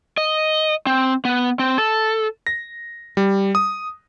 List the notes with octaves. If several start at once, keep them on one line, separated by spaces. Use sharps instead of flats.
D#5
C4
B3
C4
A4
A#6
G3
D#6